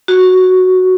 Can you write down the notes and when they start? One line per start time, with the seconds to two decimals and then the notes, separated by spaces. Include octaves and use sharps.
0.08 F#4